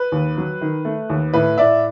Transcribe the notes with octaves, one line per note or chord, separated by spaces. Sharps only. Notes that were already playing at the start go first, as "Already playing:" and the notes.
Already playing: B4
D#2
F#3
D#3
A3
D#2
A2 B4
A2 D5 E5